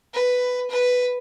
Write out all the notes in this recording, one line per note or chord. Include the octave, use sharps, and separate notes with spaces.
B4
B4